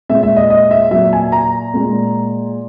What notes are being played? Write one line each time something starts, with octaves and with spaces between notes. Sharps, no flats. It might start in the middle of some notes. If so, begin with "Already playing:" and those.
A#2 G#3 E5
E5
D#5
D#5
E5
A#2 F#3 E5
G#5
A#5
A#2 G#3